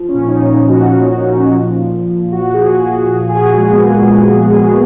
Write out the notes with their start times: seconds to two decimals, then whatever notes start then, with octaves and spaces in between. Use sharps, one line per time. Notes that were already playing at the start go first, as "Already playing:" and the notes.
Already playing: F3
0.09 C#4
0.15 A#2
0.22 C#4
0.28 D#4
0.43 A#2
0.69 F3 F#4
0.96 F3
1.23 A#2
1.51 F3
1.78 A#2
2.05 A#2
2.32 F3 F#4
2.54 G#4
2.61 F3 F#4
2.87 A#2 F#4
3.15 F3 G#4
3.29 G#4
3.35 F#4
3.41 A#2
3.56 G#3
3.68 A#2 B3
3.76 A#3